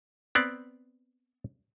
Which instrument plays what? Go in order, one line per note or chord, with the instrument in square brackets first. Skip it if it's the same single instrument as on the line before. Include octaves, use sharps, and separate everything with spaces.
[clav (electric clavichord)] B3 C4 D5